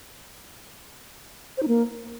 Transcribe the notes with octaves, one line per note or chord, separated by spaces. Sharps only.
C5
D#4
A#3